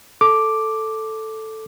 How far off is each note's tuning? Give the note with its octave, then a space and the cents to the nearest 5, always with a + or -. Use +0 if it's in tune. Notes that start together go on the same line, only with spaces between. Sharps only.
A4 +0 D6 +0